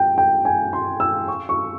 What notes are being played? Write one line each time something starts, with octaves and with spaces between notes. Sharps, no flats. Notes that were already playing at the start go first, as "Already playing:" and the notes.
Already playing: G5
G5
G#5
C6
E6
C#6
C#6